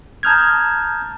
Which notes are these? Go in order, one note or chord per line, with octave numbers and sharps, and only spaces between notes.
A5 A#5 D#6 F6 G6 G#6